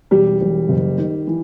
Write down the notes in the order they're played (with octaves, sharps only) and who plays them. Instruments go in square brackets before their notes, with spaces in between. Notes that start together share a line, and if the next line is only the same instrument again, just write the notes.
[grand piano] E1 [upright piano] G3
[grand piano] E1
F#1
D#3
E3